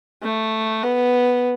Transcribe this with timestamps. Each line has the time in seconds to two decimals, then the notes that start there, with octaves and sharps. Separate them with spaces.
0.23 A3
0.83 B3